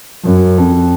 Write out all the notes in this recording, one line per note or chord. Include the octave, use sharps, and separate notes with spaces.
F#2
F2